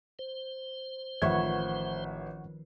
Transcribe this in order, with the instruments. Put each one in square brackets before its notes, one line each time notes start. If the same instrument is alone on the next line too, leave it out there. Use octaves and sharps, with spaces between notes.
[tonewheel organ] C5
[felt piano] A1 E5 [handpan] D#3 F3 B4 [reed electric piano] F#5 C#6 G#6